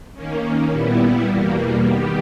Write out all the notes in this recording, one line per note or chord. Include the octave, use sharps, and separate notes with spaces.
D#3 A#3 C#4
A#2 G3 B3 E4
E2 B2 G3 A#3
D#3 G3 B3 G4